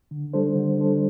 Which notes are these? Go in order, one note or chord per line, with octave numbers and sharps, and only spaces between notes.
D3
G3 D4 A4 C5
D3
G3 D4 A4 C5